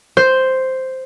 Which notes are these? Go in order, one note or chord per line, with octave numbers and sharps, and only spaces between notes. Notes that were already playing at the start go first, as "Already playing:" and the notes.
C5